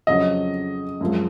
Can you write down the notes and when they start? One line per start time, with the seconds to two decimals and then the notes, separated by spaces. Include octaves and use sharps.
0.07 F2 C#3 F#3 D#5
1.01 F#2 F3 G#3